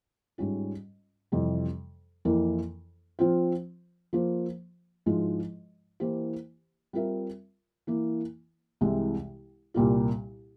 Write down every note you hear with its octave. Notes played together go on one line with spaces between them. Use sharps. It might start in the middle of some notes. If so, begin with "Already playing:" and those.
G#2 G3 C#4 F4
F2 C3 E3 G3
F2 E3 A#3 E4 A#4
F3 C4 F4 C5
F3 A#3 F4 C5
G#2 F3 G#3 E4
E3 A#3 E4 G4 C5
G3 C4 F4 A#4 E5
E3 A#3 E4
C2 C3 E3 G#3
C2 A#2 G3 A#3 F4